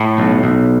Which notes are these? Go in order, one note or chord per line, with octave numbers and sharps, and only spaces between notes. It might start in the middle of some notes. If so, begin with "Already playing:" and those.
Already playing: A2
B1
B1